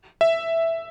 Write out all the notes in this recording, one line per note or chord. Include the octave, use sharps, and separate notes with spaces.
E5